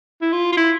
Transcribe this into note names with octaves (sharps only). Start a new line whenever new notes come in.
E4
F4
F4
E4